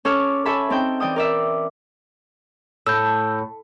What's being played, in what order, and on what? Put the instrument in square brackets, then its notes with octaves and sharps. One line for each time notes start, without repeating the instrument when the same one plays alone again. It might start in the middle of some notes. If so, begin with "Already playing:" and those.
[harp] C#4 A4 C#5 D6 F6
A4 C#5 E5 G#5 A5 B5
C4 D#4 A4 G5
E3 D5 G5 D#6
A#4 D5 E5
[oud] A2 [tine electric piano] E6 G6